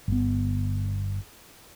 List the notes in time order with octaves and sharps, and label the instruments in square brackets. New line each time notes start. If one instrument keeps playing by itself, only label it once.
[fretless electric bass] G1 B3